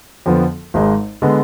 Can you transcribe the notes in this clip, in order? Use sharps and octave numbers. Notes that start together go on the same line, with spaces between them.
F2 D3 F3 B3
G#1 G#2 G#3
D3 G#3 B3